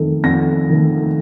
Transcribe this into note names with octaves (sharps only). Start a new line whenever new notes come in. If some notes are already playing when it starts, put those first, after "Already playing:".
Already playing: F2 D#3 A3
F2 A#6
D#3 A3